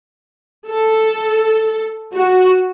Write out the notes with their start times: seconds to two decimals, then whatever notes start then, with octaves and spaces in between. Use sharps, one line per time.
0.68 A4
2.14 F#4